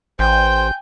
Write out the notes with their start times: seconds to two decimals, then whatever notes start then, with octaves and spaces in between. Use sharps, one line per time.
0.19 A1 C5 G5 G#5 G6